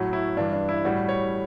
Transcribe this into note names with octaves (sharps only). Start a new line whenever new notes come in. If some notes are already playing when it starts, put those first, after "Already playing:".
Already playing: A2 F#3 F#4
E4
G2 E3 G3 D4
D4
E4
A2 G3 F#4
C#5